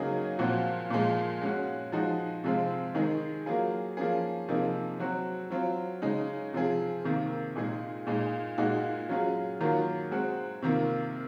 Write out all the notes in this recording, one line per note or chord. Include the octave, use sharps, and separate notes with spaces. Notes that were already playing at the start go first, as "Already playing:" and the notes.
Already playing: C#3 F#3 A#3 D#4 G#4
A#2 F3 C4 F#4
A#2 F3 G#3
G#3 C#4 F#4
F3 G#3 D#4 F#4
C3 F3 G#3 C4 F4
D#3 G#3 D#4 G#4
F#3 A#3 F4 G#4
F3 A#3 C#4 G#4
C3 F3 A#3 D#4 G#4
F#3 C4 F#4
F#3 C4 F4
C#3 G#3 D#4
C3 F3 C4 F4 G#4
C3 D#3 A#3
A#2 G#3 D#4 G#4
A#2 G#3 D#4
A#2 G#3 D#4 F#4
F#3 C#4 F4 G#4
D#3 F#3 A#3 F4
G#3 C4 F#4
C3 D#3 A#3 F4